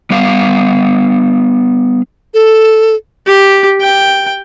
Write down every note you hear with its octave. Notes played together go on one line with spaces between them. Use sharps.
G3 B3 F5
A4
G4
G5